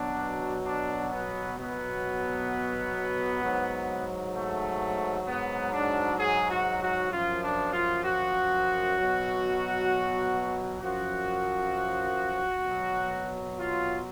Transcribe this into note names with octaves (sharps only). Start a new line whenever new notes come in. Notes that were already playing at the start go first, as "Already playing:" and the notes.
Already playing: B2 F#3 D4
D4
B3
B2 F#3 B3
G#2 F#3
A3
G#2 F#3 B3
D4
G#4
F#4
F#4
F#2 F3 F4
D4
F4
F#4
B2 F#3
F#2 F3 F#4
B2 F#3
F4